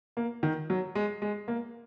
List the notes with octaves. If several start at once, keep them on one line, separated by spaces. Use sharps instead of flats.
A#3
D#3
F#3
G#3
G#3
A#3